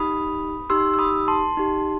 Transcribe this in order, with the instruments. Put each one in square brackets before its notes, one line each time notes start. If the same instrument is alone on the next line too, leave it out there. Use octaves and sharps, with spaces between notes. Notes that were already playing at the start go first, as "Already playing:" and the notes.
Already playing: [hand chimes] D#4 G4 B5 D#6
D#4 G4 C6 E6
E6
B5 D#6
A5 C6
D#4 G4